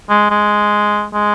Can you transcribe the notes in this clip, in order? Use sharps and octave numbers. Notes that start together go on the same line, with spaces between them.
G#3
G#3
G#3